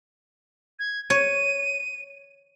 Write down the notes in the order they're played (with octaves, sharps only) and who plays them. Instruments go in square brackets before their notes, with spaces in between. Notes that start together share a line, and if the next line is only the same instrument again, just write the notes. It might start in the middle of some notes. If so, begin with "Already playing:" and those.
[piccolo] G#6
[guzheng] C#5 [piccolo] D#7